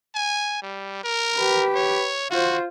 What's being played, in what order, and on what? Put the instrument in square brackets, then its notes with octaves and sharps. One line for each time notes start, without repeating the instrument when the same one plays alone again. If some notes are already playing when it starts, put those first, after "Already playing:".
[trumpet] G#5
G3
A#4
[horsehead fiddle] G4 B4
[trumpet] C#5
[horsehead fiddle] F4 C5 [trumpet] F#4